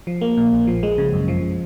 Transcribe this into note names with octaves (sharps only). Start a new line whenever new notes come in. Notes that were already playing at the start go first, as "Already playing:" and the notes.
F3
A#3
A#2
A#1
F3
G#3
C#3
F#2
F3